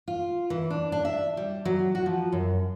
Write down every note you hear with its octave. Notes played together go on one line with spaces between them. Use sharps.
F4
E3
D4
D4
E5
G3
F#3
F#4
F3
F#2